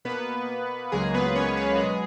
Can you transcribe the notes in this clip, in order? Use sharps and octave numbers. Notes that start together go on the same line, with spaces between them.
B2 A#3 B3 B4
C#2 C#3 F#3 G#3 A#3 G#4
B3 B4
C#4 C#5
B3 B4
F#4
B2 F#3 G#3 B3 G#4